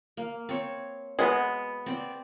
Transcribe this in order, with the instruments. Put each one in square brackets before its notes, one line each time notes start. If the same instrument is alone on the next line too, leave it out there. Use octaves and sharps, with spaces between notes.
[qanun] A#3
C4 C#5
[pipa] G#3 B3 [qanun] F#4
[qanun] C4 D5